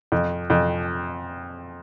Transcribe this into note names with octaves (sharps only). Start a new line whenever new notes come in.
F2
F2